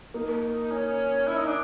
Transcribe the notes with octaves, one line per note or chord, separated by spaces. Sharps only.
A#3 D#4
C#4
E4
D#4
D4